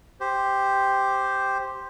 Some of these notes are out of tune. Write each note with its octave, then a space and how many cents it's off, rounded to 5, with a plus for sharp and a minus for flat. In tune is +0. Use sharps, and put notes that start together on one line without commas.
G4 +0 C5 +0